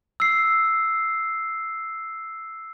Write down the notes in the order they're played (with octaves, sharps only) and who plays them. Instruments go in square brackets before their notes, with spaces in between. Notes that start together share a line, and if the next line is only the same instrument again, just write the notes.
[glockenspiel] E6 C7